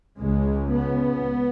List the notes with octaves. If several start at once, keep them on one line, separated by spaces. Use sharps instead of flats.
C#2 C#3 G#3
B3